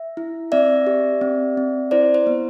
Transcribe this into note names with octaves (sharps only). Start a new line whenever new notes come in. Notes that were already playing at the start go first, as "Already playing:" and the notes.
Already playing: E5
E4
C4 D5 E5
G4
C4
C4
E4 C5 D5
C5
B3